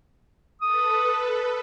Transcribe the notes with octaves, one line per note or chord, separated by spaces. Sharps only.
A4 B4 D#6